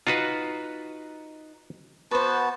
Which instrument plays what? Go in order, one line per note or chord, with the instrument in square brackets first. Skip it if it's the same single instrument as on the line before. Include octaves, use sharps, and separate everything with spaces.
[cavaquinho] D#4 [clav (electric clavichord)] F4 F#4 B4
[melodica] B3 F#4 A5 [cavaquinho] B4 C5